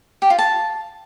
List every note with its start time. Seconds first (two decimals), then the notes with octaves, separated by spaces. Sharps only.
0.22 G4
0.30 F4
0.39 A5